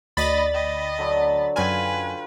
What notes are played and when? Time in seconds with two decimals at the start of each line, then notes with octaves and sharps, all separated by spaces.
0.17 D2 D5 D#5 B5 A6
0.54 D#5 G5
0.98 D3 F#3
1.56 F#2 F4 B4 G5 G#5